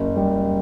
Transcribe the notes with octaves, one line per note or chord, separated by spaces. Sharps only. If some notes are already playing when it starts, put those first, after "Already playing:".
Already playing: F#1
G3